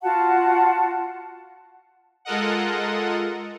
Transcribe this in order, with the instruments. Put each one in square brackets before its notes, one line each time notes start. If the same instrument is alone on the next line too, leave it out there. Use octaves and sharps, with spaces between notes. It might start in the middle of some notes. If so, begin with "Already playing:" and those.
[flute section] F4 F#4 F#5 A5
[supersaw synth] G#3 F4 A4 A#4 D#5 F#5